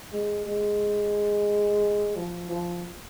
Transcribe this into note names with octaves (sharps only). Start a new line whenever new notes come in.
G#3
G#3
F3
F3